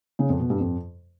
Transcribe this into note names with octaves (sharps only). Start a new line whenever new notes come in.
C#3
F2
B2
G2
F2